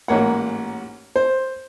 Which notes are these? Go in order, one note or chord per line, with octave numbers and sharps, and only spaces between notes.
A1 G#2 A#3 C#5 F#5
C5